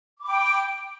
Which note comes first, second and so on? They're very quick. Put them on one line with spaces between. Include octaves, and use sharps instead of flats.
D6 B5 G5